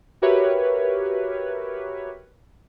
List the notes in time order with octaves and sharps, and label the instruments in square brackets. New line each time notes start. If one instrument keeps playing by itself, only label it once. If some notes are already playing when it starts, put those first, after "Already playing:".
[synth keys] F#4 G4 A#4 B4 C#5 E5